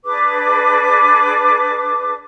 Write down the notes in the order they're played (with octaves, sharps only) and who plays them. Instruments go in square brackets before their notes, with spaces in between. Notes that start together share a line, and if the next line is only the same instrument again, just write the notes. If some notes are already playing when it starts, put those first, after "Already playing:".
[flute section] D4 G#4 B4 D6